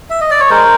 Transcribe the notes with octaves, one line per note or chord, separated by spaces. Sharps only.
E5
D#5
D5
C#5
G#3 A#4 C5